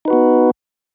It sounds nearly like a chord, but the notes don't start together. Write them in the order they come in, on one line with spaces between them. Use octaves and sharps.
D#4 B4 F#4 B3